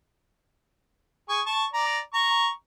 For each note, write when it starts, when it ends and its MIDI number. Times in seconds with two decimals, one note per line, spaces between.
1.29 1.41 68
1.29 1.41 85
1.46 1.65 81
1.46 1.65 85
1.74 1.99 74
1.74 1.99 82
2.14 2.48 82
2.14 2.48 85